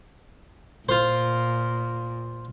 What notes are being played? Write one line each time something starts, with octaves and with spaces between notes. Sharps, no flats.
A#2 F4 C5